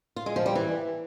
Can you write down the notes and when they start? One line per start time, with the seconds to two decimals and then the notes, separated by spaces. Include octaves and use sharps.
0.16 F4
0.26 G#3
0.36 F3
0.46 G3
0.55 E3